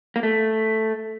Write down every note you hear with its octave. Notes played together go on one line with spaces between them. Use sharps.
A#3
A3